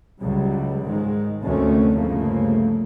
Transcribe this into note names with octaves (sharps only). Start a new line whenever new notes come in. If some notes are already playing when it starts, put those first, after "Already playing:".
C#2 F#3 G3
G#2 D#3 G#3
F1 D2 D#3 A3 C4 C#4
G1 C#3 F3 A3 A#3